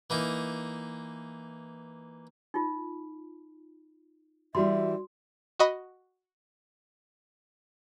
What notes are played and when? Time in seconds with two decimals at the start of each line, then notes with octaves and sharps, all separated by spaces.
0.10 E3 A#3 D#4
2.54 D#4 F4
4.55 E3 G3 E4 F#4 E5 C6
5.59 F#4 D#5 B5